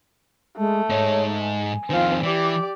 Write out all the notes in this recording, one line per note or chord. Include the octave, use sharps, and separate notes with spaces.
G#3 A3
G#2 D#4 C#5
G#5
F2 D#3 C4 F4
E3 G4 D5